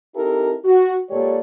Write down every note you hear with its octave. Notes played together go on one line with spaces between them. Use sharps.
C4 D#4 E4 G4 A4 A#4
F#4
A#2 G#3 G4 A4 C#5 D5